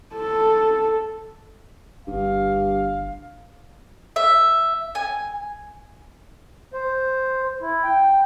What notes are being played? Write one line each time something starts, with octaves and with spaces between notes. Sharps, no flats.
A4
G1 G2 F5
E5
G#5
C5
E4
G5